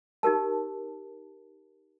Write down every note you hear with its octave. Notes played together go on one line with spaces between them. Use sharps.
D#4 G4 A#4 A5